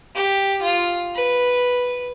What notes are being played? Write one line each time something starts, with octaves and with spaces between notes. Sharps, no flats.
G4
F4
B4